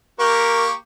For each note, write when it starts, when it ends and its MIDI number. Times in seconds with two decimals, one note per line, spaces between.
0.19 0.73 58
0.19 0.73 67
0.19 0.67 70
0.19 0.73 85